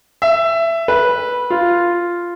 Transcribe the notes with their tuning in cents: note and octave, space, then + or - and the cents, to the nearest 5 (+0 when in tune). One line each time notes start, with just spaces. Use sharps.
E5 +15
B4 -10
F4 -5